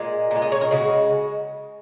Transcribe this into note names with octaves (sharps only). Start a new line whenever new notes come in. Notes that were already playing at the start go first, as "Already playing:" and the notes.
Already playing: A#2 G#3
A#2 G#3
D#5
C#5
A#4
C#3 G#3 F#4